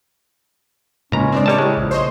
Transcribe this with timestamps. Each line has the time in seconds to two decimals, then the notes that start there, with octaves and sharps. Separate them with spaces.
1.12 C#2 A2 C#3 A#3 C#4 A#5
1.32 G#3 C4 D4 D5
1.46 G3 A#4 C#5 A5
1.58 G#3 E4
1.77 A#1 F3
1.91 C5 C#5 D#5